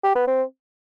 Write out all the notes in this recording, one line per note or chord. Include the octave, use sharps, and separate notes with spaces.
G4
B3
C4